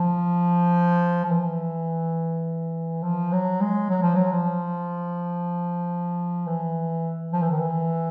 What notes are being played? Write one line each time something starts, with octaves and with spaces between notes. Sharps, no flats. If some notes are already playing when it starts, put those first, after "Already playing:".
Already playing: F3
F3
E3
F3
F#3
G#3
F#3
F3
F#3
F3
E3
F3
E3
D#3
E3